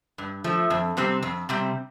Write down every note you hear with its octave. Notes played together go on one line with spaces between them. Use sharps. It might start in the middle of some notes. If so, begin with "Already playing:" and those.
G2
F3 A3
F2
C3 G3 C4
F2
C3 G3 C4